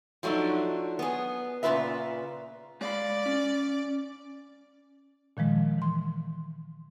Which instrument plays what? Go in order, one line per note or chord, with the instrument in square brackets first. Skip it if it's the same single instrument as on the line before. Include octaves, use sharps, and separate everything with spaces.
[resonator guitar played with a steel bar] F3 F#3 A3 D4 D#4
B3 G#4
A#2 C#3 F4 B4 E5
[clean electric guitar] G#3 F5 B5 [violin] D5
[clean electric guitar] C#4
[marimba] A#2 D#3 F3 G#3
E3 C6